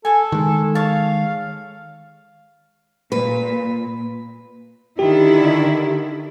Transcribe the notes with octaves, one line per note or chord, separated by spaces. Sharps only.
A4 G#5 A5
D#3 G#3
C#5 F5 A5
A#2 B4
D3 D#3 E4 G4